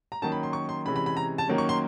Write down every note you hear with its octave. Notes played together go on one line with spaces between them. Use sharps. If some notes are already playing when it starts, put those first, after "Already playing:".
A#5
D#3 F#3 A#3 C#4 A5
B5
C6
C#6
C6
C3 E3 G#3 C#4 B5
B5
B5
A#5
A5
D#3 F#3 A#3 C#4
C#6
C6